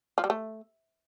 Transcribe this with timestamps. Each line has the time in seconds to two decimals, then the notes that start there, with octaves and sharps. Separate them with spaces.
0.18 F3
0.24 G3
0.30 A3